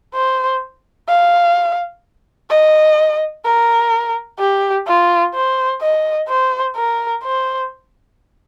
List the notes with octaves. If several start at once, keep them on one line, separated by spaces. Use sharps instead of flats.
C5
F5
D#5
A#4
G4
F4
C5
D#5
C5
A#4
C5